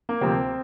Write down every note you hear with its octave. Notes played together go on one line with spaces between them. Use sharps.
A#3
D2 C3 F3 A#3 C4